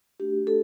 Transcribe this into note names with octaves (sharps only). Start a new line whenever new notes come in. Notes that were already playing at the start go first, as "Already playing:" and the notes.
A3 D4 F#4 G4
A4